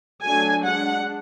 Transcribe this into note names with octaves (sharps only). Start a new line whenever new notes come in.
F#3 A3 D4 G#5
G#3 D4 F#5